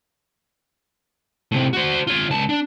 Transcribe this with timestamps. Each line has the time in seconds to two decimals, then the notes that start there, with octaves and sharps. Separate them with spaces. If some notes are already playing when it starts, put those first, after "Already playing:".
1.52 A2 C3
1.73 F#4 C5
2.07 F4 C#5
2.30 C#2 A5
2.49 D4